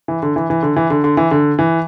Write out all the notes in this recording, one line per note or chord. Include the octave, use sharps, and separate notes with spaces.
E3
D3
E3
E3
D3
E3
D3
D3
E3
D3
E3